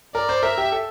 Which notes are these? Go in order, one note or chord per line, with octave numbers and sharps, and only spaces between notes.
A#4 D5
C5
A#4 E5
G4
A4